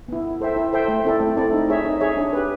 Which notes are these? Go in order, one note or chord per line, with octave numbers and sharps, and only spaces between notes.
B3 E4
E4
A4 C5 E5 G5
E4
A4 C5 E5 G5
A3
C4 E4 A4 D5
A3
C4 E4 A4 D5
D#4
G#4 C#5 E5
D#4
G#4 C#5 E5
D4
G4 B4